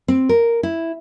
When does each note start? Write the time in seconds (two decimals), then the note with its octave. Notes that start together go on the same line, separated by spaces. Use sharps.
0.08 C4
0.29 A#4
0.63 E4